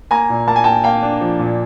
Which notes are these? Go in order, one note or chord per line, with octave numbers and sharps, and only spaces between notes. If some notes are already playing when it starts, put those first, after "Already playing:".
A#3 G#5 A#5
A#2
A#3 A5
G#5
A#3 G5 A5
A#3 F5 G5
D4
F3
A#2